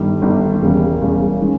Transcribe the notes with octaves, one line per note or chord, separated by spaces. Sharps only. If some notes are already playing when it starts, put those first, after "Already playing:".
Already playing: G1 G2 D#3 G3
G1 G2 D#3 G3
E1 E2 C#3 G3 A#3
E1 E2 C#3 G3 A#3
D#3 G#3 C#4